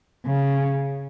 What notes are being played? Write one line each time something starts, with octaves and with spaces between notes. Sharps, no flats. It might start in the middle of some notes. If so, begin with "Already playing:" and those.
C#3